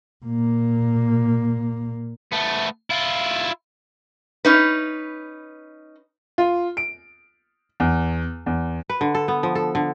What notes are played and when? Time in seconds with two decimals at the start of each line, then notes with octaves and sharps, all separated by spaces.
0.25 A#2 A#3
2.32 A3 B3
2.90 E4 F4
4.45 C#4 D#4 B4
6.38 F4
6.77 D7
7.80 E2
8.46 E2
8.90 B4
9.01 D3
9.15 A4
9.28 B3
9.43 F3
9.55 A4
9.75 D3